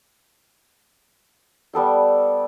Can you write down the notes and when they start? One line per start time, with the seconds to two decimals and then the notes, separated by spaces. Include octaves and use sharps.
1.73 G3 B3 A4 G5